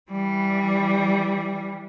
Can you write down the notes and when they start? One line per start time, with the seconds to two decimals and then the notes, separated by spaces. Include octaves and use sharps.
0.11 E3 G3